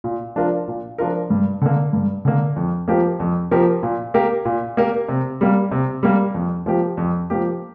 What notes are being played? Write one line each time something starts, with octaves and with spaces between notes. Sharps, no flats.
A#2
F3 D4 F4 A#4
A#2
F3 D4 F4 A#4
G2
D3 A#3
G2
D3 A#3
F2
F3 A#3 G4 A#4
F2
F3 A#3 G4 A#4
A#2
A#3 G4 A#4
A#2
A#3 G4 A#4
C3
G3 A#3
C3
G3 A#3
F2
F3 A#3 G4
F2
F3 A#3 G4